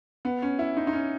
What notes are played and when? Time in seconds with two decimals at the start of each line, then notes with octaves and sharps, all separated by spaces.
0.25 B3
0.42 C#4
0.59 E4
0.77 D#4
0.87 D#4
0.93 C#4